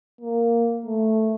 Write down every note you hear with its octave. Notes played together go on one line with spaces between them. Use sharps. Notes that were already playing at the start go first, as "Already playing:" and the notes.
A#3
A3